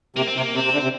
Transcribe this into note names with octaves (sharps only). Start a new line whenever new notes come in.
C3 A#3
C4
C3 A#3
C3 C4
C3
D3
C3